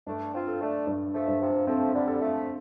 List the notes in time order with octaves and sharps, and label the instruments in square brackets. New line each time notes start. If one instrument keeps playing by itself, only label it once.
[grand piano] G2 [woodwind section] A3 D4
[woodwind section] C4 F4
[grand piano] A4
[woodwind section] A3 D4
[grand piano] G2
[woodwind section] F3 A3
[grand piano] G2
[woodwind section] C3 F3
[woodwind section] F3 A3 [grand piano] C4
[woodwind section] D3 G3
[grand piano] A4
[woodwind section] F3 A3